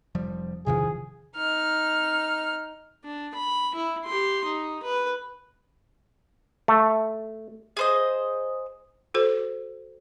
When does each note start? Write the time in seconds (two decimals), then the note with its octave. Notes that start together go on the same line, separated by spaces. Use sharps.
0.15 F1 F3 G3
0.66 G1 E2 C3 D#3 F3 G#4
1.36 D#4 F6
3.04 D4
3.34 B5
3.75 E4
4.05 G4 C6
4.44 D#4
4.83 B4
6.68 A3
7.77 G#4 C5 D#5
9.14 F#4 A4 C5